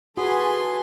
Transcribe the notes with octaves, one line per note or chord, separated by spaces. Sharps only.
F#4 G#4 A4 B4 G#5 C6